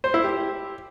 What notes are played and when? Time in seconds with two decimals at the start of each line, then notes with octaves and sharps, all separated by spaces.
0.04 C5
0.14 E4
0.24 G4